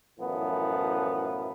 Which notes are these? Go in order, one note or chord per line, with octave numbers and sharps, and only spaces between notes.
F#2 A2 E3 F3 B3